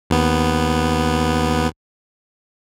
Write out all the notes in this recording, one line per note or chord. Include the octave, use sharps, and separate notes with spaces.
D#2 B3